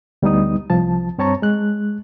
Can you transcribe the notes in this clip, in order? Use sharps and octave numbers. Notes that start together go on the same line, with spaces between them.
D2 G3 B3 D#4 D#6
C2 F3 A5
G2 C4 C#5 A5 A#5 C#6
G#3 F#6